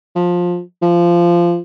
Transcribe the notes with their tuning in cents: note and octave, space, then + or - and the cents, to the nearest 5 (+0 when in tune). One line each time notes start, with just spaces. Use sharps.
F3 +15
F3 -15